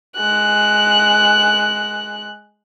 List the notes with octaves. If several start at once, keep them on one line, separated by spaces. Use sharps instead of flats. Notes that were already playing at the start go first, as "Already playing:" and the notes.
G#3 F#6